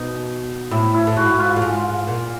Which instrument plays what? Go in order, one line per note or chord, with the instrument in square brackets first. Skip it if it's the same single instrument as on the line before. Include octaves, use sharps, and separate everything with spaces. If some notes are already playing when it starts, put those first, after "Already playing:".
Already playing: [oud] B2 [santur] D#4
[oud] A2 [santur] E4
[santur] E4
[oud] A2
[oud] G#2 [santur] F#4
[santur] F4
[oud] A2
G#2
A#2